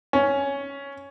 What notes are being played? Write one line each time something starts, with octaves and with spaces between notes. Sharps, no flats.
C#4